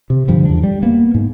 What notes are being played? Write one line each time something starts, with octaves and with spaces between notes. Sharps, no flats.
C3
G2 D3 F3 G3
E2 D4
G3
A#3 B3
G#2